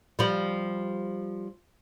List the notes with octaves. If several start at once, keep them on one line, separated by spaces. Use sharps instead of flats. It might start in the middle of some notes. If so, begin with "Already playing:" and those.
F3 G3